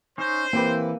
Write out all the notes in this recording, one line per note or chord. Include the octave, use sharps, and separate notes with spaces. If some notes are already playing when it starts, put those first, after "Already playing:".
C#4 D#4 C5
E3 A#3 C4 G4 B4